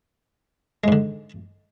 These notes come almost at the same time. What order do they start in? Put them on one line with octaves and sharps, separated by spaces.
G#3 G#2 D3